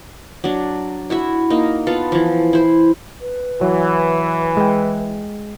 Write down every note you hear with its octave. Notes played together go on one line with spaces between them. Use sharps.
F#3 D4
E4 F#4 E5
A#3 D#4
B3 F4 A4 B4
E3 F3
E4 C5
B4
E3 F#3
G#3 G5